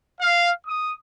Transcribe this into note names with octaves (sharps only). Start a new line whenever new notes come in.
F5
D#6